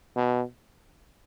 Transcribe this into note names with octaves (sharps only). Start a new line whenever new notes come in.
B2